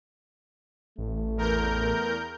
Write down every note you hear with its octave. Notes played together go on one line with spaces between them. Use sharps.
A1 A3
E2 A#4 G6